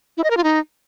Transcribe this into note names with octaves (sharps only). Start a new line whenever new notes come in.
E4
D#5
A#4
F4
D#4